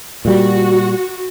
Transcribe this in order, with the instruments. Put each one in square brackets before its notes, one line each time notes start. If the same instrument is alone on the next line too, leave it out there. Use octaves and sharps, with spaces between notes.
[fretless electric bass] A#2 G3 [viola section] F#4